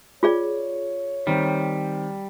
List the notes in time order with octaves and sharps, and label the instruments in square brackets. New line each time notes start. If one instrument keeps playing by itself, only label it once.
[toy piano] F4 G#4 D5 [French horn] C#5
[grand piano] D#3 C4 [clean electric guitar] G3